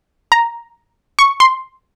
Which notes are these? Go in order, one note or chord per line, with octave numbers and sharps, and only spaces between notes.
A#5
C#6
C6